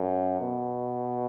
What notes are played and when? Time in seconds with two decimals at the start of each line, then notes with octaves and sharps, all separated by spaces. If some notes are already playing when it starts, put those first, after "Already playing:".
Already playing: F#2
0.40 B2